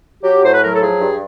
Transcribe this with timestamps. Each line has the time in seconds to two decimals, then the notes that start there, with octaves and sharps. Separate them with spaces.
0.23 F#3 G4
0.43 A2 C5
0.54 B4
0.63 F#3 A#4
0.73 A4
0.81 F3 G#4
1.01 G2